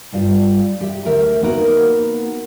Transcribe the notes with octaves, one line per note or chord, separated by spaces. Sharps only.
G2 G3 F4
G4 E5
D2 A#4 E5
A#3 B3 D#4 F#4 A#4